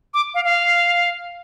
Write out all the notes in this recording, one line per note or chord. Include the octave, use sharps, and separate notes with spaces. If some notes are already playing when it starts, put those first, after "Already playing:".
D6
F5
F5